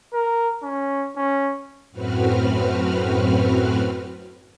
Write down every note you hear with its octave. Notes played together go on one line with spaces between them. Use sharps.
A#4
C#4
C#4
F#2 A2 C4 F#4 B4 F6